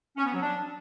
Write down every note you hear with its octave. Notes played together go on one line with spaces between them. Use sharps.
C#4
B3
F#3
D4